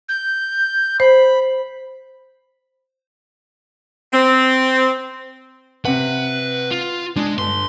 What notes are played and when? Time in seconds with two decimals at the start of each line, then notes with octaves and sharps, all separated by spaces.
0.09 G6
1.00 C5 B5
4.13 C4
5.85 C3 B4 F#5
6.71 F4
7.16 G#3 D4
7.38 G1 C6